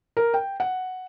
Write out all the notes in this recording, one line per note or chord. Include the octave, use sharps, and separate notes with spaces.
A#4
G5
F#5